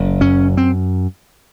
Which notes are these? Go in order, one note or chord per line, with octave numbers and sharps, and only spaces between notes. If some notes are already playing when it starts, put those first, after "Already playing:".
Already playing: F#1 C#3
F#2 C#4
C4